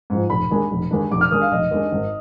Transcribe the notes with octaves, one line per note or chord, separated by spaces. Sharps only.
G#2 F3
F1 B5
D#2 D#3 G#3 D4
F1
D#2 D#3 G#3 D4
F1 D6
F6
D#2 D#3 G#3 D4 D#6
F5
F1 D#5
D#2 D#3 G#3 D4
G#1